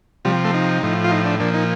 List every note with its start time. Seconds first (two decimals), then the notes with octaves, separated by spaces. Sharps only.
0.25 C3 F3 G3
0.44 A3
0.54 D#4
0.83 A2 F3
1.04 F4
1.12 D#4
1.25 D4
1.40 A#2 F3 D4
1.54 D#4